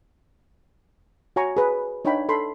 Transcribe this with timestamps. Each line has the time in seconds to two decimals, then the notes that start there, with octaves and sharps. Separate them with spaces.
1.36 F#4 C#5 G#5 A#5 C#6
1.57 G#4 B4
2.05 D4 D#4 C#5 F5 G5 B5
2.29 A4 B5 C6